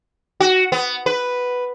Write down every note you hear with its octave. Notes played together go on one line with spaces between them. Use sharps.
F#4
B3
B4